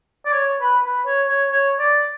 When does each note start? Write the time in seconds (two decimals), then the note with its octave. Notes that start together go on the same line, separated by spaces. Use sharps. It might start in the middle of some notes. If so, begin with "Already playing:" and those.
0.25 D5
0.32 C#5
0.61 B4
0.84 B4
1.05 C#5
1.28 C#5
1.50 C#5
1.79 D5